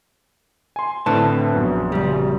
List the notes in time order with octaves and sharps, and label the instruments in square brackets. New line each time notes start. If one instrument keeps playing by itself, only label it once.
[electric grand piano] G#5 C6
[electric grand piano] A2 D3 C4 [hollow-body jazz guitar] B4 A5
[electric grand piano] A#1 F#2 B3
[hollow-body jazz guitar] C#2 G3